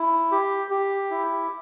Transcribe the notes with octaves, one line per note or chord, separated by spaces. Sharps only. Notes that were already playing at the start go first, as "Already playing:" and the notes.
Already playing: E4
G4
G4
E4